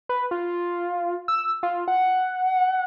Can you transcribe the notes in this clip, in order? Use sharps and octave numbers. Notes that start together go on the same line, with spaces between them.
B4
F4
E6
F4
F#5